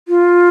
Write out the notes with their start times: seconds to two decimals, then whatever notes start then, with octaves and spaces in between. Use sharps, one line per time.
0.08 F4